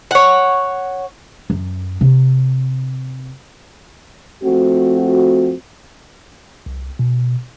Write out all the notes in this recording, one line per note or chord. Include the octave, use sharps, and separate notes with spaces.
C#5 F#5
F#2
C3
F3 A3 C4 F#4
C2
B2